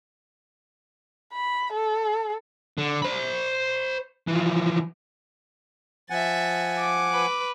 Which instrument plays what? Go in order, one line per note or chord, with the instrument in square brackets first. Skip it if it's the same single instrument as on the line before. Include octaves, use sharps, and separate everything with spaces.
[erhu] B5
A4
[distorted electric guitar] D3
C5 B5
E3 F3
[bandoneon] F3 F#5 G#5 [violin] E5 A6
[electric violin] D6
[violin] B4